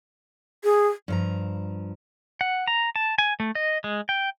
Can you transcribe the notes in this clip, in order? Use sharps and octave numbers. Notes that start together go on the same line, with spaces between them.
G#4
G2 F3 A#5
F#5
A#5
A5
G#5
A3
D#5
G#3
G5